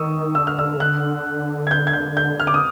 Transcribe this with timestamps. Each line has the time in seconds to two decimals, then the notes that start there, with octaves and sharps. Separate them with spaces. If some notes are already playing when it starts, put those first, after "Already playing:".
Already playing: D#3 C#6 D#6 E6
0.35 D3 E6
0.47 F6
0.59 E6
0.77 C#3
0.80 D3 F#6
1.67 G#6
1.71 G6
1.87 G#6
1.93 G6
2.17 G6
2.40 F6
2.47 D6
2.54 D#6